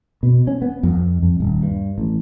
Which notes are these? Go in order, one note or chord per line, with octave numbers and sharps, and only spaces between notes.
B2
C#4
B3
F2
F2
D#1
G2
A1